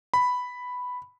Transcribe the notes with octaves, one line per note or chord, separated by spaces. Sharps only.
B5